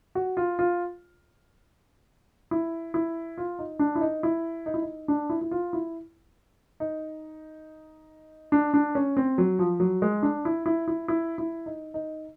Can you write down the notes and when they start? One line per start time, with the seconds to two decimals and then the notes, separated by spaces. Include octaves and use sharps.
0.15 F#4
0.37 F4
0.59 F4
2.51 E4
2.94 E4
3.38 F4
3.59 D#4
3.79 D4
3.95 E4
4.01 D#4
4.23 E4
4.66 D#4
4.74 E4
4.82 D#4
5.08 D4
5.30 E4
5.41 E4
5.51 F4
5.73 E4
6.80 D#4
8.52 D4
8.74 D4
8.95 C#4
9.17 C4
9.38 F#3
9.59 F3
9.80 F#3
10.02 G#3
10.23 D4
10.45 E4
10.66 E4
10.88 E4
11.08 E4
11.38 E4
11.66 D#4
11.94 D#4